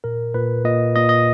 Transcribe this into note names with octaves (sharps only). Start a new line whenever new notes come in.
A#2 A#4
A#2 B4
A#2 D#5
A#2 D#5
D#5